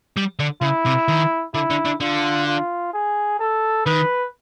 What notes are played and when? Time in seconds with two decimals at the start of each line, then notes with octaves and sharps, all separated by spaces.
0.16 G3
0.39 D3
0.62 C#3 E4
0.86 C3
1.08 D#3
1.54 D3 E4
1.70 D3
1.85 D3
2.01 D3 F4
2.47 F4
2.93 G#4
3.39 A4
3.86 D#3 B4